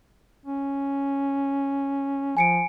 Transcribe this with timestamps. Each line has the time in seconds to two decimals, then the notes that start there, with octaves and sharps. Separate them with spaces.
0.45 C#4
2.37 F3 G#5 C#7 D7